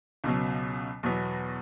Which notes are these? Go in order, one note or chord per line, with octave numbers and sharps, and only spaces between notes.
C#2 B2 F#3
E2 B2 F#3 B3